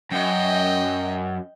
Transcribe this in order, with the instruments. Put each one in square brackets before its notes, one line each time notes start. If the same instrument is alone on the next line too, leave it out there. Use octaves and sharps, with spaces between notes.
[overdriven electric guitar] F#2 [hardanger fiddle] D#5 G5